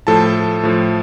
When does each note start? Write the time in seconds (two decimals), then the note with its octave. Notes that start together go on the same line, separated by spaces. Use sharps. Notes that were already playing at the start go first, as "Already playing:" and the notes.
0.07 A2 F3 A4 A5
0.63 A2 F3